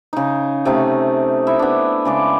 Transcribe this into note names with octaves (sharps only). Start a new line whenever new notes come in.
C#3 D#4
C3 A3 C#4 D#4
E4 E5
B3 D4
C#3 G#3 D5